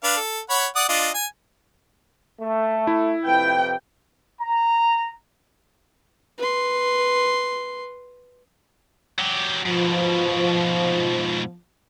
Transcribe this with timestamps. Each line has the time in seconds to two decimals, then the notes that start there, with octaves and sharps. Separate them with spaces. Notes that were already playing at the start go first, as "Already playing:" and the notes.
0.04 D4 B4 F5
0.17 A4
0.50 C#5 F#5 B5
0.76 D5 F#5 D#6
0.89 D4 F4 D#5
1.14 G#5
2.40 A3
2.87 E4
3.25 F2 C3 B4 G5
4.40 A#5
6.38 B4 C6
9.19 F#3 G4
9.66 G#2 B2 F3